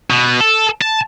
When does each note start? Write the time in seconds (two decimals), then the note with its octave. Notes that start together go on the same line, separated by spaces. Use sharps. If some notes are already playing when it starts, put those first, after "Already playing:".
0.10 B2
0.40 A4
0.82 A5